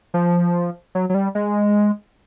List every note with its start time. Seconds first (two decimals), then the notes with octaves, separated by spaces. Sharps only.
0.14 F3
0.95 F#3
1.10 F#3
1.14 G3
1.35 G#3